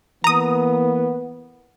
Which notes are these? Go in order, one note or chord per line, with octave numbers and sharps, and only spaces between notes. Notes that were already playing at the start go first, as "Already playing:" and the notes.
E3 A#3 B3 A#5 D#6